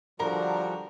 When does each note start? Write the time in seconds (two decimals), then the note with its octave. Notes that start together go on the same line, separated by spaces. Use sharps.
0.20 D3 F3 G3 F#4 A#4 A#5